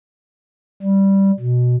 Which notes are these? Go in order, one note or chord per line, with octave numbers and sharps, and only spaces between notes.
G3
B2